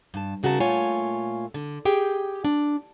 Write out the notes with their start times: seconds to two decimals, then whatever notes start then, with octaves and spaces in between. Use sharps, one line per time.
0.14 G2 A5
0.43 D#2 C#3 F#4 A#4 B4 A5
0.60 A#2 A3 F4 C#5 G#5
1.54 D3
1.85 G4 G#4 G5
2.45 D4